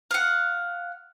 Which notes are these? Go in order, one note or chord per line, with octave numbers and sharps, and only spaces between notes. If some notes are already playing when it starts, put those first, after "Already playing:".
F5 F#5